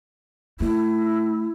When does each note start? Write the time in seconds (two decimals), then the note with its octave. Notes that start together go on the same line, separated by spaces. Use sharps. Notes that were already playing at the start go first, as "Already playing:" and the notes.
0.60 A3 E4